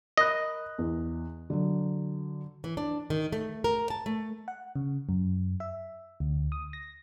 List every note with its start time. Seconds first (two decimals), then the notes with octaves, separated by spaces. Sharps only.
0.17 A#4 D#5 B5 F#6
0.78 E2
1.50 D3 F#3
2.64 E3
2.77 D4
3.10 D#3
3.32 A3
3.64 A#4
3.90 A5
4.06 A3
4.48 F#5
4.76 C#3
5.09 F#2
5.60 E5
6.20 D2
6.52 D#6
6.73 A#6